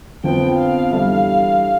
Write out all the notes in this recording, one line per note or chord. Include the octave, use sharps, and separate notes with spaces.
F2 D3 F3 B3 G5
F5
E3 G3 D4 A4 E5